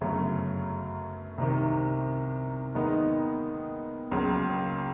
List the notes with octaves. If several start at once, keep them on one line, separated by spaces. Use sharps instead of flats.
G1 F#2 C#3 F#3 A3
C2 C3 D#3
D#2 D#3 G#3 B3 D#4
C#2 C#3 F#3 A#3